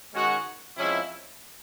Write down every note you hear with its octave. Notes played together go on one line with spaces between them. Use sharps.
D#3 G#3 C#4 F#4
C3 F3 G#3 C#4 E4